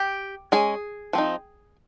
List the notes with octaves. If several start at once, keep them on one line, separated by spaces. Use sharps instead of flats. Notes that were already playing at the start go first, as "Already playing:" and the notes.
Already playing: G4
G#3 C#4 G#4
F3 C4 D#4